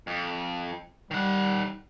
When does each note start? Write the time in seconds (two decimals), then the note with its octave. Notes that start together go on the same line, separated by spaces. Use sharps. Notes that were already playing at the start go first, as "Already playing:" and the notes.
0.07 F2
1.11 D#3 G3 F#5